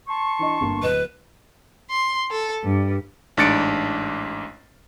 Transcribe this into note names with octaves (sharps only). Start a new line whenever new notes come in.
A5 C6 C#6
E3 D4 D#5
G1 G2 A#3
D1 B4 D#5 E7
C6
A4
G2
A1 G#2 D4 A6 C#7 D7